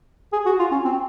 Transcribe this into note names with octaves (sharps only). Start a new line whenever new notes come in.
G#4
F#4
F4
C#4
C4